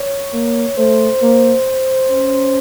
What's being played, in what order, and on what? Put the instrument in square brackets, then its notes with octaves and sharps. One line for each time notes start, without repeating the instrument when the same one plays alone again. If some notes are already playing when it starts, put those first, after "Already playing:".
Already playing: [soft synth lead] C#5
[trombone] A#3
[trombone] A3 [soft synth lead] C5
[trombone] A#3
C#4